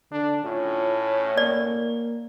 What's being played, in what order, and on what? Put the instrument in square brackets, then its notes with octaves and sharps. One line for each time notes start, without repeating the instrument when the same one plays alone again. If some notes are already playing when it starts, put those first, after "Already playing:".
[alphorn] D3 [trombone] D4
[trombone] A2 [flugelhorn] C#4 [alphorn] F4
[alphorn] A#3 [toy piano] D5